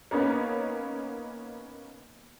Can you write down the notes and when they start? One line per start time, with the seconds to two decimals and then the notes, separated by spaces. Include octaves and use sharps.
0.11 A#3 B3 C#4 D#4